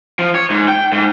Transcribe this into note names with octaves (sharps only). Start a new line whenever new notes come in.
F3
C#5
G#2
G5
G#2